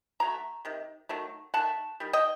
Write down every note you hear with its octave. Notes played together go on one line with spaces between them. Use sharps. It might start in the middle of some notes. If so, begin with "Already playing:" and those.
D3 F#3 A3 A#5
C3 D#3
D#3 F#3 A3
D#3 A3 F#5 A5
D#3 G3
D#5 G5